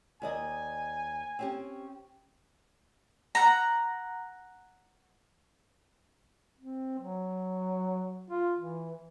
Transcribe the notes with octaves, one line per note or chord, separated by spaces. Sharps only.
D#2 D5 D#5 G#5
C4 C#4 G4
F#5 A#5
C4
F#3
F4
E3